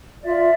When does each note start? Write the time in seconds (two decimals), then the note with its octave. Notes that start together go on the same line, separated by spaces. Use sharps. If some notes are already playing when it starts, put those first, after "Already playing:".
0.22 F4 D5 E5